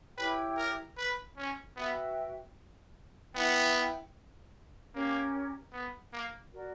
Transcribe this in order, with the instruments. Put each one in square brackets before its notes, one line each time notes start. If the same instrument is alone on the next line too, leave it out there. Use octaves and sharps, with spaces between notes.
[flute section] E4 G4 C#5 G5 [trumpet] B4
[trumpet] A#4
B4
C#4
[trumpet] B3 [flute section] F#4 B4 E5 G5
[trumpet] B3 [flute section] E4 B4 E5 G5
[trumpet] A#3 [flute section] C#4 G4 A#4
[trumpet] B3
A#3
[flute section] F#4 A#4 D5